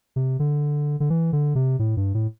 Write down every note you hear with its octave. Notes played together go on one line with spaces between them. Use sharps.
C3
D3
D3
E3
D3
C3
A2
G2
A2